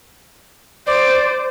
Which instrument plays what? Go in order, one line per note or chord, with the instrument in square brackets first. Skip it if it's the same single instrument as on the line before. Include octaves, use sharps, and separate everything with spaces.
[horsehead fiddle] C5 [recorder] D5